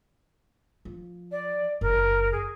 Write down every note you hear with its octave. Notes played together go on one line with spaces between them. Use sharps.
F3
D5
F#1 A#4
G#4